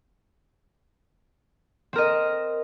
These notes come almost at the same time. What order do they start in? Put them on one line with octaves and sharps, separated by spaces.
C4 A#4 D#5